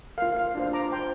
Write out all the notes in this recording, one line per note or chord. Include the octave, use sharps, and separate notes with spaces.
F4 A#4 F5
F5
D4 F4 C5
A#5 D6
F4 C5 G5 C6